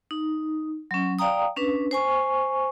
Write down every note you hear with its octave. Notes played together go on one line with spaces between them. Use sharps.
D#4
F#3 C#4
D5 F5 G5 A#5 D#6
C#4 D4 B4
C5 G#5 C#6